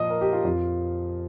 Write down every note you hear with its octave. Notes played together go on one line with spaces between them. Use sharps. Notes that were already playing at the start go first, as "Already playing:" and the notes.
Already playing: A#2 F3 D#5 D#6
A#4
G4
F4
F2 F3 F4